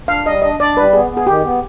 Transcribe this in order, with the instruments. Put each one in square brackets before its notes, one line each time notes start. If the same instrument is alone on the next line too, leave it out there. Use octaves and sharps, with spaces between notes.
[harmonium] D4 [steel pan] F5
[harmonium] G3 [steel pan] D#5
[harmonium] D4 [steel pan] D#5
[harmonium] D4 [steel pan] D5
[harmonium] G3 [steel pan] B4
[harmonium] B3 [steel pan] G#4
[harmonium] B3
[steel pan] G#4
[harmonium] D#3 [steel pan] G4
[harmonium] B3